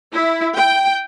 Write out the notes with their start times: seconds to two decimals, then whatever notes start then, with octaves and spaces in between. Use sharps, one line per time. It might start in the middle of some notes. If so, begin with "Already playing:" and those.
0.12 E4
0.57 G5